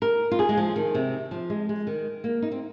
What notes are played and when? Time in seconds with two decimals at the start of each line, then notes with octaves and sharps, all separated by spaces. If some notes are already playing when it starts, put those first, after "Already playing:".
0.02 A#4
0.31 F4
0.39 G#4
0.49 G#3
0.57 F3
0.76 D#3
0.95 C3
1.31 F3
1.50 G#3
1.69 G#3
1.87 D#3
2.24 A#3
2.42 D#4
2.52 C4